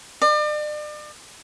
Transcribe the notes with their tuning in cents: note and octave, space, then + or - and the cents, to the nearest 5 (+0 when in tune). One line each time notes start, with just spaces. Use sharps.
D5 +40